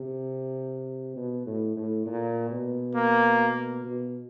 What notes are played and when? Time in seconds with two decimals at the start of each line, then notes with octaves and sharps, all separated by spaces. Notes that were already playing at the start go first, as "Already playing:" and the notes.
Already playing: C3
1.16 B2
1.46 A2
1.76 A2
2.06 A#2
2.50 B2
2.95 A#3
3.84 B2